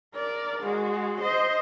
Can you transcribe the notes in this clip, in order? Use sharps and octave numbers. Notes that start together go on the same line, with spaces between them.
A#4 D5
G#3 F#4
C5 D#5